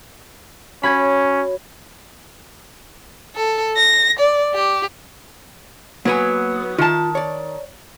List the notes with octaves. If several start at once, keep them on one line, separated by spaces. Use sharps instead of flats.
C#4 F#4 C#5 B5 G#6
A4
A#6
D5
G4
F#3 A#3 B3 B4 G#5
D#3 F4 A5
C#5 D5